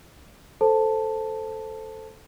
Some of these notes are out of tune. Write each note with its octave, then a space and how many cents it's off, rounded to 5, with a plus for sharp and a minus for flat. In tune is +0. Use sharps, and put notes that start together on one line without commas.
A4 +0 C5 +0 A5 +5